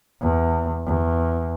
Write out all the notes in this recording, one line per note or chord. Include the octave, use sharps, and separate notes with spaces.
E2
E2